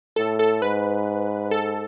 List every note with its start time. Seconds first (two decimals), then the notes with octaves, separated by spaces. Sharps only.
0.16 A2 A4
0.39 A4
0.62 G#2 B4
1.51 A4